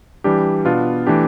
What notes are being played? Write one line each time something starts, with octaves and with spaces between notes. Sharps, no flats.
E3 G3 D4 G4
B2 B3 D4 F4
E3 A3 D4 G4